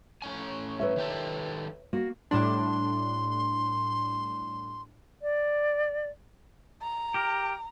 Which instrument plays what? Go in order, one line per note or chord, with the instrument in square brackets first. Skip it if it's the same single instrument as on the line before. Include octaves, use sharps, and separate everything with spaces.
[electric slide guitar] A2 C#4 G#5
[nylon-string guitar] B4 C#5 E5
[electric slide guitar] D#3 G4 A4
[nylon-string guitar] A#3 F#4
[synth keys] A2 G3 D4 [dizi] C6
[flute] D5
[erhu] A#5
[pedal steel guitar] G4 A#4